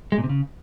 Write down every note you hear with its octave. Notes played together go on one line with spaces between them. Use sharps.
G#3
A#2
C3
C#3